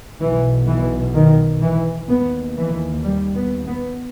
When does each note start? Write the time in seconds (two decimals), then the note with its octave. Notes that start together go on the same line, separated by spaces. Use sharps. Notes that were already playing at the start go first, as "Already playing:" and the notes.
0.20 B1 B2 E3
0.67 E3
1.14 D#3
1.62 E3
2.08 D#2 B3
2.56 E3
3.03 G3
3.35 B3
3.67 B3